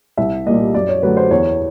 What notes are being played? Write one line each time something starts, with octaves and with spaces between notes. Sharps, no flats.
C2 E5
A#2 G3 A#3 D#5
F#2 D5
C#5
D3 F#3 A3 B4
C5
E2 C#5